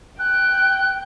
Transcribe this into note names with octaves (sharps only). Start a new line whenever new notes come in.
G5 F#6